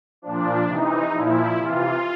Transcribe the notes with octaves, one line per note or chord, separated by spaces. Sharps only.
A#2 F3 D4
C3 E3 D#4
A#2 F3 E4
C3 E3 F4